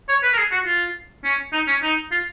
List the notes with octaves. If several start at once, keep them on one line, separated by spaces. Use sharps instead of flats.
C#5
B4
A#4
G#4
F#4
F4
C#4
D#4
C#4
D#4
F4